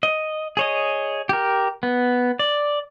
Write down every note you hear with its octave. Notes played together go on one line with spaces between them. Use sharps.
D#5
G#4 C#5 D#5
G4 A#4
B3
D5